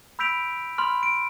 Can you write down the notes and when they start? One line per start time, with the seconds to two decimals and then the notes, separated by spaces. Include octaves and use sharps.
0.19 B5 E6 G6 B6 D7 F7
0.78 B5 C6 F6
1.03 D7